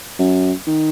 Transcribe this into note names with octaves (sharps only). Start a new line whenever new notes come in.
F#2
D#3